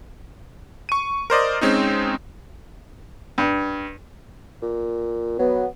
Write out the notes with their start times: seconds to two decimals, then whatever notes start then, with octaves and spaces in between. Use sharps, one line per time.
0.89 C#6 D#7
1.30 A#4 C5 D5 D#5
1.61 G#3 C4 C#4 D#4
3.38 G2
4.62 A#2
5.39 F#3 B3